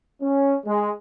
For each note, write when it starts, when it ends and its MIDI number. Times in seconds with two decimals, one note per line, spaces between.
0.20 0.54 61
0.65 0.89 56